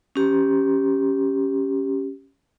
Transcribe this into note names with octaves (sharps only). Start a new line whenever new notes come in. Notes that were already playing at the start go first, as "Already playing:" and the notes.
C#4 G4